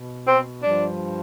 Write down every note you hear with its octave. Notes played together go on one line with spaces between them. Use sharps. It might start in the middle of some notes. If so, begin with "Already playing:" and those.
Already playing: B2
C4
G2 F3 D4